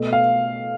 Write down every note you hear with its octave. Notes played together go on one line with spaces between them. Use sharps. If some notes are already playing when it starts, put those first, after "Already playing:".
Already playing: B2 A3
F5